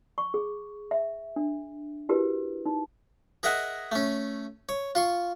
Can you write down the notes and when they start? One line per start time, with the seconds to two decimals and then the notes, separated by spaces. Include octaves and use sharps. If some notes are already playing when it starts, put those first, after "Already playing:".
0.18 C#6
0.34 G#4
0.91 E5
1.36 D4
2.09 E4 F#4 G4 A#4 B4
2.66 D#4
3.43 G#4 A#4 D#5 E5 F#5 G#5
3.92 A3 C#4
4.69 C#5
4.95 F4 C6 C#6